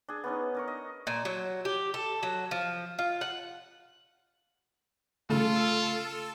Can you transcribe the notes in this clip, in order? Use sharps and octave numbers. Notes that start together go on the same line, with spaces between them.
D4 G#4
B3 C#4 D#4
D4 A#4 C#6
D#5
A#2
F#3
G4
A4
F#3
F3
F4
F#5
C#3 A3 F4 A4 E6